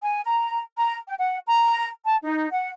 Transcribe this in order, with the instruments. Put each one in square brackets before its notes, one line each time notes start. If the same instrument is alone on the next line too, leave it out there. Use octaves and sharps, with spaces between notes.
[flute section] G#5
A#5
A#5
G5
F#5
A#5
A5
D#4
F#5